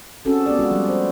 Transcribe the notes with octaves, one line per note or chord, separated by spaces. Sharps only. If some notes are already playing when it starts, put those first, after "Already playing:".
C4 C#4 F#4 G#4 A4
B3 C#4 G4 D5
G#3 F4 F#4
F3 G3
C5